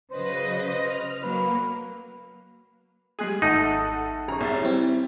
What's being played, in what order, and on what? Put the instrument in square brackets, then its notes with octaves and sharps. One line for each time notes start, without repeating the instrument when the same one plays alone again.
[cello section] C#3 F#3 D#5 [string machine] B4 [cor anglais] C5
[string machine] F6
[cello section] F#3 [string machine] A#3 [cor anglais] B4
[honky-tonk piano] G3 G#3 G#4 [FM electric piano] D#6 F#6 C7
[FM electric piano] G#1 [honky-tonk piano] A3 A4 F#5 [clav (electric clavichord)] D#4
[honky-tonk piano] F#2 A#5 [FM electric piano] G#4 C#5
[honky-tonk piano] C2 E5 A6
[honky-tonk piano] G3 [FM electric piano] C4 E4